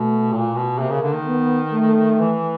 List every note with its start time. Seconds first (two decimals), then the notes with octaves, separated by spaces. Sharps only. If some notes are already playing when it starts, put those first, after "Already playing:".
Already playing: B2 A3
0.32 A#2
0.56 B2
0.79 C3 A#3
0.90 C#3
1.02 D3
1.14 D#3
1.26 B3
1.73 A3
2.20 E3